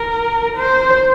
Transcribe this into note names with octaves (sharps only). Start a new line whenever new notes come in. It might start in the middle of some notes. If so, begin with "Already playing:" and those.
Already playing: A#4
C5